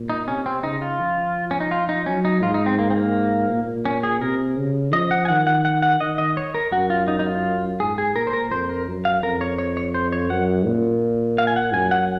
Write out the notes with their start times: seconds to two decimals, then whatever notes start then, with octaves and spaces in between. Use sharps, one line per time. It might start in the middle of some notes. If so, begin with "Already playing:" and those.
Already playing: A#2
0.10 D#4
0.28 C3 C#4
0.46 C4
0.63 C#3 D#4
0.82 F4
1.00 F3
1.51 C#4
1.60 D#4
1.71 F4
1.89 D#4
2.06 F#3 C#4
2.25 D#4
2.43 G#2 F4
2.54 D#4
2.66 C4
2.79 A#3
2.90 C4
2.96 A#3
3.49 A#2
3.85 C#4
4.03 G#4
4.21 C3 A#4
4.57 C#3
4.93 F3 D#5
5.11 F#5
5.25 G#5
5.28 D#3 F#5
5.47 F#5
5.65 F#5
5.82 F#5
6.00 D#3 D#5
6.18 D#5
6.37 C#5
6.54 A#4
6.72 F#2 F#4
6.90 F4
7.08 D#4
7.19 D#4
7.26 F4
7.80 G#2 G#4
7.98 G#4
8.15 A#2 A#4
8.27 C5
8.33 A#4
8.51 F2 C5
8.69 A#4
8.87 F#2
9.05 F5
9.23 F2 A#4
9.41 C#5
9.58 C#5
9.77 C#5
9.94 C5
10.12 C#5
10.30 F#2 F#5
10.66 A#2
11.38 F5
11.47 G#5
11.56 F#5
11.73 F#2 G#5
11.91 F#5